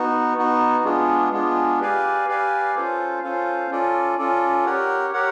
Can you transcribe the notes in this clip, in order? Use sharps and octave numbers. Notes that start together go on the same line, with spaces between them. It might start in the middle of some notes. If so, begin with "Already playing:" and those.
Already playing: B3 D#4 F#4
B3 D#4 F#4
G#3 B3 D4 F4 G#4
G#3 B3 D4 F4 G#4
G4 B4 D5 F5 G#5
G4 B4 D5 F5 G#5
C#4 F4 A4 C5 F5
C#4 F4 A4 C5 F5
C#4 F4 A4 D5
C#4 F4 A4 D5
G4 A#4 C#5 F#5
G4 A#4 C#5 F#5